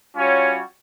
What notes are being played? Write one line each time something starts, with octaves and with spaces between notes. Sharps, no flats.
G3 C#4 F4 F#4 C#5